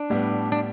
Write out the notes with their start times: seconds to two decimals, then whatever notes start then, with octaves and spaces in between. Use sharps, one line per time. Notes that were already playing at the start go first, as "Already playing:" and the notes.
Already playing: D4
0.10 A2 G3 B3
0.52 D4